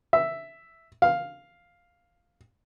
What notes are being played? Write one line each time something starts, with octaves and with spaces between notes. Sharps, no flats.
E5
F5